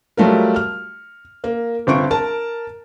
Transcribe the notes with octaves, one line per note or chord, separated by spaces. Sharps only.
F#3 G3 A3 F4 A#4
F6
A#3
G1 C4 F4 C#6 D7
A#4 A5